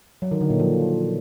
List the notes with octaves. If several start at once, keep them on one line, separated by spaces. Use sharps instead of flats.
F#3
D#3
D3
A#2
F3